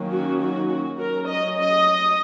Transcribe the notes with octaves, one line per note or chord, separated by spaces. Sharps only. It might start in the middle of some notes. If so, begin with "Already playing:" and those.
Already playing: D#3 F#3 A#3 C#4
F#4
F#4
F#4
F#3 C#4 A#4
D#5
D#5